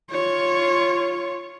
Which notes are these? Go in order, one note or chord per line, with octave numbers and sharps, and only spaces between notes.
F4 C#5